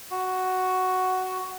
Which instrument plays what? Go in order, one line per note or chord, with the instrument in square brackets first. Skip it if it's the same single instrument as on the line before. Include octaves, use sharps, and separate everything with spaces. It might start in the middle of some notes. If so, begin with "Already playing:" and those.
[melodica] F#4